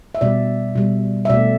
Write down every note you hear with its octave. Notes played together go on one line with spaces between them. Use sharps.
E5
B2 G3 D5
B2 G3
E5
B2 A3 D5